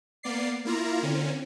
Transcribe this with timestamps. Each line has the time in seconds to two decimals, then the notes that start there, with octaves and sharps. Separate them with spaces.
0.23 A#3 B3 D5 C7
0.65 A#3 E4 F4 A#5
1.03 D3 C4 C#4